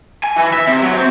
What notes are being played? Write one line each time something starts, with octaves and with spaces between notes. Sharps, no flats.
G#5
E3
E5
C3
F#3
C4